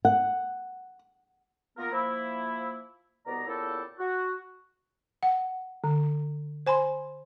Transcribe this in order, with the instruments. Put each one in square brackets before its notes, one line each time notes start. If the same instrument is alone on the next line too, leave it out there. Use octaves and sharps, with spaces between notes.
[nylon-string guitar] F#5
[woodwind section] D#3 A#3 B3 F4 A#4
F3 A#3 E4
C2 B2 B3 D5 A#5
A#2 C#3 B3 E4 G4 A4
F#4
[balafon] F#5
D3
C5 G#5 B5 C6